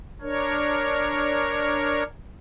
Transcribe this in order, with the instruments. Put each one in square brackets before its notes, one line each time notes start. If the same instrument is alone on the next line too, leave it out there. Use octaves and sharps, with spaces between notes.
[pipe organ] D4 A#4 C#5